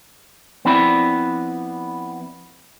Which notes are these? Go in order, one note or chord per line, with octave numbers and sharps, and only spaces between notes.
F3 B3 C4 E4 D5 B5